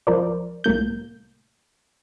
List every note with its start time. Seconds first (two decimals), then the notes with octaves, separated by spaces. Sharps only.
0.07 C#2 F3 A#4 C5 D5
0.64 C2 A2 A#3 G6